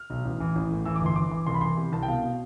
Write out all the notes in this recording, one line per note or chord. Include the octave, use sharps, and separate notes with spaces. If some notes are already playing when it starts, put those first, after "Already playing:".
Already playing: F6
B1
A1
E3
A1
A2
E3 E6
D6
G1
C6
E3 D6
E3
C2 C6
B5
E3 C6
C3
C2 A5
G5
B2 F5
B2